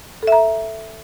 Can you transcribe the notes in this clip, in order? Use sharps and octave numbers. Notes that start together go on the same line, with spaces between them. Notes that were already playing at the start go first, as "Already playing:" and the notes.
A4 E5 A#5